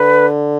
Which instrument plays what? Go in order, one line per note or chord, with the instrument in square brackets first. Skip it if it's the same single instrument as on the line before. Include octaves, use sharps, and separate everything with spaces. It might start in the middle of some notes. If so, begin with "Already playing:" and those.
Already playing: [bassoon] D3 [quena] B4